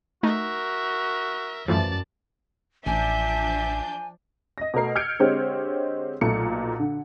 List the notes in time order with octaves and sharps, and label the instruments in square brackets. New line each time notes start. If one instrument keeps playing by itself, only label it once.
[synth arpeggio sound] A3 D#4 [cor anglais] F#4 [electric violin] A#4 E5
[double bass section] F#2 [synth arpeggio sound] E3 F3 A3 [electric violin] D5 A5
[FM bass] A1 [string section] F3 D4 G6 [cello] E5 [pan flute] G#5
[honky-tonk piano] D#5 A#6
B2 A3 A#4 C7
E6 F6 G6 G#6 C#7 D7
D3 G#3 C4 G4 C5 C#5
B1 A#2 A3 C#7
D3